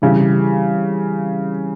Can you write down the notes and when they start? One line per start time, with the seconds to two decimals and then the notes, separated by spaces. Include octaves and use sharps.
0.02 C#3 E3 G3 C4 E4 G4